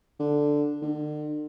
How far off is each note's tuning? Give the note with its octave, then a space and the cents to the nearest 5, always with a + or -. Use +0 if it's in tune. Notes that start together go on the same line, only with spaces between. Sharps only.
D3 +0
D3 +40